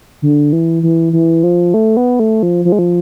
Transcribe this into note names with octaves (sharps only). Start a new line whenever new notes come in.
D3
E3
E3
E3
F3
A3
B3
A3
F3
F3
G#3
F3